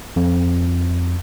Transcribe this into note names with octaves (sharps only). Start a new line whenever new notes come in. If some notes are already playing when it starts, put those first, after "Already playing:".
F2